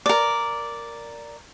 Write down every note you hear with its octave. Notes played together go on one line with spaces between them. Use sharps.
A#4 D5